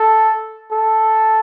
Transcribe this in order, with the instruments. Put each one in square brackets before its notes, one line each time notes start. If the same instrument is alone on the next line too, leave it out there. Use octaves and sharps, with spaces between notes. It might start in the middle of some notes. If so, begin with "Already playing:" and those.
Already playing: [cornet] A4
A4